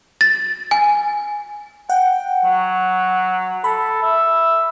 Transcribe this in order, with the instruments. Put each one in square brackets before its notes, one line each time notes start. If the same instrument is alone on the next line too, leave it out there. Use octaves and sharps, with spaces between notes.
[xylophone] A6
G#5
[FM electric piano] F#5 [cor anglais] G5
[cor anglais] F#3
[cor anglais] A4 [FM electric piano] B5
[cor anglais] E5